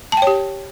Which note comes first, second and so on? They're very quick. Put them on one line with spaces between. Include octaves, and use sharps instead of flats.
A5 G5 C#5 G4